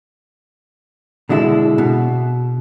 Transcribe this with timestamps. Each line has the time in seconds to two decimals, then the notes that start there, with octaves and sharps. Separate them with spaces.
1.29 B2 D3 G#3 E4
1.78 B2